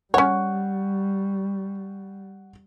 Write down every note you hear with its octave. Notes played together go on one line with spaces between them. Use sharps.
G3 C#4 C#5 F#5 C#6